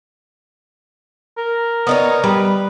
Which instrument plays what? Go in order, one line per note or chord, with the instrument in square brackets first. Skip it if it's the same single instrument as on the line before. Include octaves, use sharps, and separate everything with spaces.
[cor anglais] A#4
[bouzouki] B3 D#4 C#5
[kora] G3 [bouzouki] B4